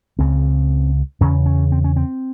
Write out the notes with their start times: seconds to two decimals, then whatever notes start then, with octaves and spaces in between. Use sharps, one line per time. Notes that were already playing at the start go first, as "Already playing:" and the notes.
0.19 C#2 C#3 C4
1.21 E2 C#3 C#4
1.46 C#4
1.72 C4
1.84 C#4
1.96 C4